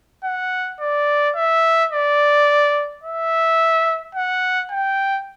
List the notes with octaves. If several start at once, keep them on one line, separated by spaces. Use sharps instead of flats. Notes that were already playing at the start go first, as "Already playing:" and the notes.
F#5
D5
E5
D5
E5
F#5
G5